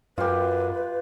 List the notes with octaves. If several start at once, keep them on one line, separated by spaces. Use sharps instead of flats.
F#2 F4 G4 B4